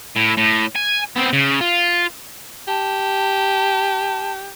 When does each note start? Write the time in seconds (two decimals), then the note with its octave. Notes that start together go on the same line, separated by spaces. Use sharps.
0.16 A2
0.38 A2
0.76 G#5
1.16 B3 C4
1.33 C#3
1.61 F4
2.68 G4 A5